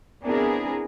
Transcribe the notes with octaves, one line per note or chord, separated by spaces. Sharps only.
B3 C4 D4 E4 G#4 A#4